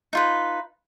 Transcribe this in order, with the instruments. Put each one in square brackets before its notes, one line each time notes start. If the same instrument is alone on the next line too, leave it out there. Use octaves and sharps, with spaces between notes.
[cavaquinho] D#4 F4 B4